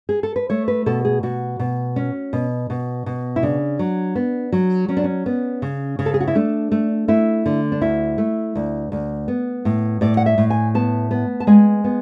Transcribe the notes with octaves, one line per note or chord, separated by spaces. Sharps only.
G#4
A4
B4
A3 C#5
B4
B2 A4
G#4
B2 F#4
B2
C#4
B2
B2
B2
E4
C#3 D4
F#3
B3
F#3
F#3 C#4
D4
C#4
B3
C#3
C#3
A4
G#4
F#4
E4
A3 D4
A3
A3 E4
D3
D4
D2 E4
A3
D2
D2
B3
A2
A2 D5
F#5
E5
A2
G#5
B3 A5
B3
A5
G#3 G#5
B3